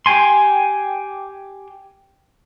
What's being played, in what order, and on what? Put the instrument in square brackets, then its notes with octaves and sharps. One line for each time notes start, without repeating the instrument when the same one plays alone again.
[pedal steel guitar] G4 G5 G#5 C6